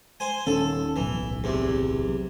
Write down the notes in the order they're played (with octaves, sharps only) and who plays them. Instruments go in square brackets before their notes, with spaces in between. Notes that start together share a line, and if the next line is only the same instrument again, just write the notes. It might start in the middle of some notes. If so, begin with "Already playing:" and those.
[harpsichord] C5 G#5
[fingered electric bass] D#1 D#3 C#4 [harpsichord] A4
[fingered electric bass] D1 B1 [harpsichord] E3
[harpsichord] E2 C3